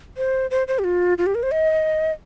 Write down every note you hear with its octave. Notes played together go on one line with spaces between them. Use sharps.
C5
C5
C5
G4
F4
F4
G4
A#4
C5
D#5